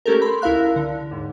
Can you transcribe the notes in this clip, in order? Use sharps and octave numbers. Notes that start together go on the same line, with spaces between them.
A3 A#3 C#4 G4 A4 A#4
B5 C6
C#2 E4 A#4 F5 F#6
D3
D#2 G#2